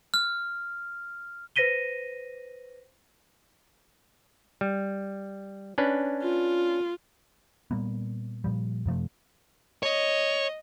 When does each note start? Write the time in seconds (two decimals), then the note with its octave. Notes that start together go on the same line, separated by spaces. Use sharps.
0.14 F6
1.56 B4 C5 A#6 B6 D#7 G7
4.61 G3
5.78 C#4 D4 B4
6.22 F4
7.71 A#2 G3 A#3 B3
8.44 A#2 F3 G3
8.86 F#2 C3 F3 A3
9.83 C#5 D#5